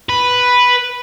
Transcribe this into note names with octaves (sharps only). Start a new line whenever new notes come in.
B4